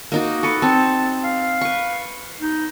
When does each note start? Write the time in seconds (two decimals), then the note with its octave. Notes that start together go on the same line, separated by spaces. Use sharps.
0.12 A#3 D#4 F#4
0.43 A4 B4 C#6
0.62 C4 A5
1.24 F5
1.61 B4 C#6
2.40 D#4